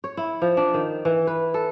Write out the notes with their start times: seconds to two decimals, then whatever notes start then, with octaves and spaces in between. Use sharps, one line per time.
0.04 C#5
0.17 E4
0.42 F3
0.57 D4
0.74 D#3
1.05 E3
1.27 B4
1.54 A4